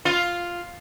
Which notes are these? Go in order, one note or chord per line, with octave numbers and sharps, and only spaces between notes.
F4